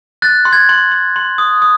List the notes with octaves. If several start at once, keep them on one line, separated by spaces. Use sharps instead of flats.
F#6 A6
C6
G#6
C6
C6
C6
D#6
D#6